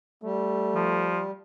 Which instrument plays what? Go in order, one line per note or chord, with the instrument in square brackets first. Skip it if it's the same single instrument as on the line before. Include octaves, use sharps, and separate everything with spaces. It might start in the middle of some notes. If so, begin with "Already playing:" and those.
[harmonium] G3 [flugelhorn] A3
[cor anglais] F3